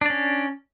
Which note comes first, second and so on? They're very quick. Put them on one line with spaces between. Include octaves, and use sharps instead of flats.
D4 D5 C#4